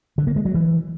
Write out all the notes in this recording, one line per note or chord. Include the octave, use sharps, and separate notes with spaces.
D3
A#3
G#3
F#3
E3